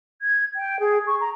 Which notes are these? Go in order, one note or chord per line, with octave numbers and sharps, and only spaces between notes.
G#6
G5
G#4
C#6
A#5